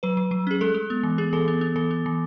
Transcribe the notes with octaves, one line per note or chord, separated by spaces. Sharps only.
F#3 B4
F#3
F#3
C#4 G#4
G#3 A4
G#3
B3
E3
B3 G#4
E3 A4
B3
B3
E3 A4
B3
E3